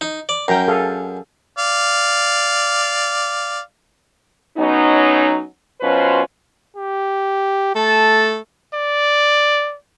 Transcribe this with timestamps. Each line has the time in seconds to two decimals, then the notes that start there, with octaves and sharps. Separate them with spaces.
0.01 D#4
0.29 D5
0.48 F#2 A#4 G5 A#5
0.68 G#4 A4 F5
1.58 D5 F5
4.57 F#3 B3 C#4 D#4
5.81 B2 F#3 C#4 F4 B4 C5
6.76 G4
7.75 A3 A4 A5
8.73 D5